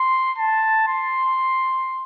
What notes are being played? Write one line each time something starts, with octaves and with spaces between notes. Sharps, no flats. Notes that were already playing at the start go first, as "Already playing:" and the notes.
Already playing: C6
A5
C6